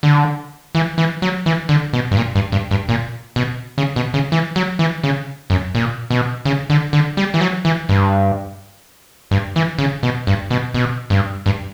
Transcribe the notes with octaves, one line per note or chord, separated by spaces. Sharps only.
D3
E3
E3
F#3
E3
D3
B2
G2
A#2
G2
G2
G2
A#2
B2
C#3
B2
C#3
E3
F#3
E3
C#3
F#2
A#2
B2
C#3
D3
D3
G3
E3
F#3
E3
G2
G2
E3
C#3
B2
G2
B2
B2
G2
G2